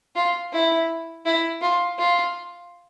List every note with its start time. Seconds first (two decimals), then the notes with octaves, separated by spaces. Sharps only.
0.16 F4
0.53 E4
1.26 E4
1.62 F4
1.99 F4